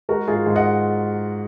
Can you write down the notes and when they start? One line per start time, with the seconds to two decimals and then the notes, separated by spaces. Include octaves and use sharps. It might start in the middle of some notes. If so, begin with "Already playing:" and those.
0.09 G#3 F#4 A#4
0.27 G#2 F4 G#4
0.46 G#2
0.56 D#5 F#5